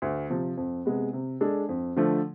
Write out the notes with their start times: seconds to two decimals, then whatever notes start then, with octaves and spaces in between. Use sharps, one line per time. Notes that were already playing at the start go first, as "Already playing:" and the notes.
0.02 D2
0.30 C3 F3
0.57 F2
0.86 C3 G#3 B3
1.13 C3
1.41 G#3 D4 A4
1.69 F2
1.97 D3 F3 A3